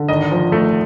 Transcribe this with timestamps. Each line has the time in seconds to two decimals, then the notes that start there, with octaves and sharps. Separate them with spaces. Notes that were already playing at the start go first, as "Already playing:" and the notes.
Already playing: D3
0.08 G#1 D#5
0.32 F3
0.52 A3